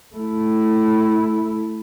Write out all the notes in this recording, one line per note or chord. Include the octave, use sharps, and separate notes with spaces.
A3 E4